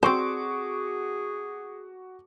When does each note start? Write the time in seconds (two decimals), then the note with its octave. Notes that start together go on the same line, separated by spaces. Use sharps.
0.03 C4 F#4 G#4 C5 C#6 D6